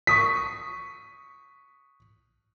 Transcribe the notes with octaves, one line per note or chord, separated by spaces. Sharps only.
C#6 D#6 B6